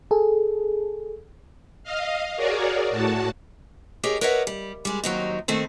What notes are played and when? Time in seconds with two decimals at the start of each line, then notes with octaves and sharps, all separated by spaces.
0.11 G#4 A4
1.84 D#5 F5
2.37 F#4 G#4 A#4 C#5 D5
2.91 A2 F#4 A5
4.03 G4 G#4 A#4 C#5 D#5
4.21 A#4 B4 C#5 D#5 E5 F#5
4.47 G3
4.85 G3 G#3
5.04 D#2 F#3 C4 D#4
5.48 D#3 A3 A#3 C4